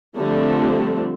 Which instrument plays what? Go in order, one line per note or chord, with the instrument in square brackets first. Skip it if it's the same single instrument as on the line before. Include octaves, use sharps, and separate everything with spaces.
[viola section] D3 F3 G3 A3 C4 D4